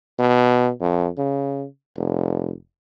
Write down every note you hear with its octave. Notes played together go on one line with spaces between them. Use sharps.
B2
F2
C#3
F1